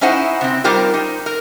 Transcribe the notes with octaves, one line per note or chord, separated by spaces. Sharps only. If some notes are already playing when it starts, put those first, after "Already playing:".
C#4 D#4 E4 C5 F#5
C3 C4
G3 D#4 F4 G4 A#4 C5
D#4
A#4